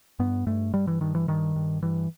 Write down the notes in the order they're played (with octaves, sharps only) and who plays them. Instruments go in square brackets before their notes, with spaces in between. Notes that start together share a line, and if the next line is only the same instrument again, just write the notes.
[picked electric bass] G2 B3
G2 A3
G2 G3
E3
G2 D#3
E3
G2 D#3
G2
G2 E3